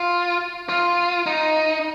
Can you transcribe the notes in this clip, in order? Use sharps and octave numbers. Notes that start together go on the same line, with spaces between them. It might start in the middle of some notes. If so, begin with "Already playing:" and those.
Already playing: F4
F4
D#4